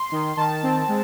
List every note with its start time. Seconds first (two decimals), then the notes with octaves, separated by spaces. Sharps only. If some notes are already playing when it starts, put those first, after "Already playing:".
Already playing: C6
0.12 D#3
0.37 D#3 A5
0.63 C4
0.88 G#3